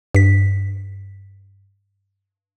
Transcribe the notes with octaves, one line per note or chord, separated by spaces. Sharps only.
G2 B6